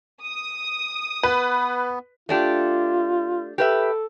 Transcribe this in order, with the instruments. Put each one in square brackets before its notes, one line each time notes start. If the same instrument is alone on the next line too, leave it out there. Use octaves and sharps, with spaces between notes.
[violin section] D#6
[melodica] B3 [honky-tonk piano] B4
[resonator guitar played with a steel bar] A3 D4 G4 [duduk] F4
[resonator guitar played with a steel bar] G4 B4 E5 [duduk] A4